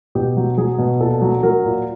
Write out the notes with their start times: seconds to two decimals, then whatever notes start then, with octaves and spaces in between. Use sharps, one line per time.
0.15 B2 G4
0.37 F#3
0.58 F#3 G#4
0.78 B2
1.00 A#2 A4
1.22 F#3
1.43 F#3 A#4
1.65 A#2